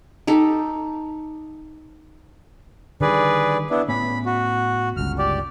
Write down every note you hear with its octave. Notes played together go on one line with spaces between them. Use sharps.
D#4 G4 A4
D3 D#3 G3 G#4 B4 D5
B3 D4 E4
A2 B3 C#4 B5
F#4
G1 C#2 F6
G4 D5